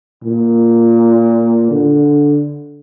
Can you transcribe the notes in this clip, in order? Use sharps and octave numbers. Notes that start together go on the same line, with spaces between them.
A#2
D3